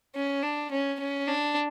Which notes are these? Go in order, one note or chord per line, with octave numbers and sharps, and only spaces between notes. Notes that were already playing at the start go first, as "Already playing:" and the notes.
C#4
D4
C#4
C#4
D4